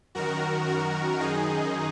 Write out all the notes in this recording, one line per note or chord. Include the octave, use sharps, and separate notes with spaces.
F#2 D#3 F#4 A#4
F#4
F#2 D#3 D#4 G#4